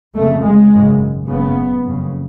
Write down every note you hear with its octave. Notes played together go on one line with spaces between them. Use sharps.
F1 F2 C#3 A3
G#3
G#1 F#2 C#3
F#1 F#2 C#3 B3
F#1 F2 C#3